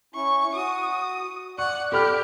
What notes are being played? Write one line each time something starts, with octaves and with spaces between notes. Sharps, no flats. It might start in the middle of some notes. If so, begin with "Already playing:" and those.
C#4 E4 C#6
F#4 D#6
D5 F#5 C#6
G4 A4 B5 F6